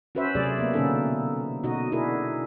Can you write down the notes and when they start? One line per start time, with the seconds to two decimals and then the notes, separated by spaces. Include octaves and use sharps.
0.15 C#4 F#4 B4 C5 E5
0.35 C3 F#3 A3 G#4 D5
0.58 A#3 B3
0.73 B2 D3 A#3 C#4 D#4 A4
1.63 B2 D#4 F#4 D#5
1.92 D4 E4 G#4 A#4